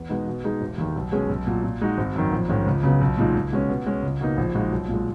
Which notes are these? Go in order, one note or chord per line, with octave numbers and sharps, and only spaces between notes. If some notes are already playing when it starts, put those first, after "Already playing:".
Already playing: E2
B2 G#3 B3 D#4
B2
G#3 D#4 G#4
E1
D#2 D#3
B1
B2 G#3 C#4 G#4
B1
A#2 F#3
A#2
G#3 D#4 F#4
G#1
F#2 D#3
A#1
G#2 D#3 G#3 C#4
C#2
C#3 F#3 B3
B1
A#2 G#3 D#4
C#2
B2 G#3 C#4
B2
G#3 C#4
C#2
B2 A#3 D#4
A#1
A#2 G#3 D#4 F#4
B1
A#2
G#3